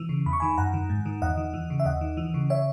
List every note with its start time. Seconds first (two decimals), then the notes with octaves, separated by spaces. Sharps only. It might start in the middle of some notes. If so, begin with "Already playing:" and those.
Already playing: E3
0.09 C#3
0.26 E2 B5
0.33 C#6
0.40 D#3 G#5 B5
0.58 F#2 F#5 A#5
0.74 D#3
0.89 G#2
1.06 D#3
1.22 E2 D#5 F#5
1.37 D#3
1.54 E3
1.70 C#3
1.80 E5
1.85 D#2 D#5 F#5
2.01 D#3
2.17 E3
2.34 C#3
2.50 C#5 E5